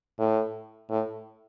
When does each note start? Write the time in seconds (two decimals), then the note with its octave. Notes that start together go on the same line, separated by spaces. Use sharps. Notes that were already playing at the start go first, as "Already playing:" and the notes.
0.19 A2
0.90 A2